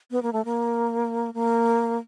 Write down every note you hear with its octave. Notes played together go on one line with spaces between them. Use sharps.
B3
A#3
A3
A#3
A#3